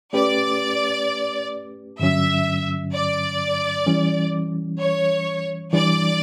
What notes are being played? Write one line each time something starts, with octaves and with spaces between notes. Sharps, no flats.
A3 C#4 G4 B4 D5
G2 D3 F#3 C#4 E5
D5
E3 G3 C#4
C#5
E3 G3 D4 D5